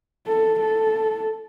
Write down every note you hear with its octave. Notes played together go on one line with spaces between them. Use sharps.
A4
A4